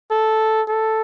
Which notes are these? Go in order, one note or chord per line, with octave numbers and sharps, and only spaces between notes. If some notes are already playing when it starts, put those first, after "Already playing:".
A4
A4